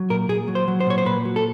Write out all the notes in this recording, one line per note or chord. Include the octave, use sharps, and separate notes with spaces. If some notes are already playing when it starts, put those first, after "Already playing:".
Already playing: F#3
A#2 A#4
A#2 G#4
F#3
C5
F#3
C5
A#2 C#5
C5
A#2 B4
F#3
A4